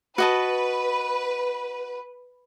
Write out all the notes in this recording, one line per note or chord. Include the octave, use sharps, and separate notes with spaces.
F#4 B4 D#5 A5